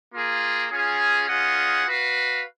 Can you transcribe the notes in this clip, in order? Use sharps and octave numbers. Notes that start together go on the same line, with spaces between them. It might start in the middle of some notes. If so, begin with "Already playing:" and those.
A#3 F4 G#4
C#4 F4 G#4
C#4 F4 G#4 D#5 F#5
F#4 B4 F5